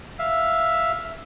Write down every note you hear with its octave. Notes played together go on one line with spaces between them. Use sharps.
E5 F5